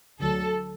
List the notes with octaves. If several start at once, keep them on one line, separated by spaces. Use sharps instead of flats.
D2 D3 F#3 A4